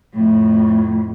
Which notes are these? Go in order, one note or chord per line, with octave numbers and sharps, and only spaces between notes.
F2 A2